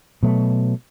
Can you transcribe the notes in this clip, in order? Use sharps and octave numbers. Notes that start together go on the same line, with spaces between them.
B2 F#3 A3